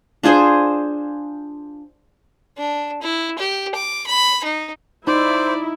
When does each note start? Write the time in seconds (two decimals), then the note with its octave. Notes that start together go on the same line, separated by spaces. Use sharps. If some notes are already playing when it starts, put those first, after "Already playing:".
0.23 D4 F4 G#4 C5
2.58 D4
3.02 E4
3.38 G4
3.75 D6
4.06 B5
4.44 D#4
5.07 D#4 E4 C5 D5